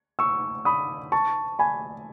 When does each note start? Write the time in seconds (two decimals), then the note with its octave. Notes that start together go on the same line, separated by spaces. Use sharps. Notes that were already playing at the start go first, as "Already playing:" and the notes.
0.19 C#6 E6
0.65 B5 D#6
1.12 A5 C#6
1.59 G#5 B5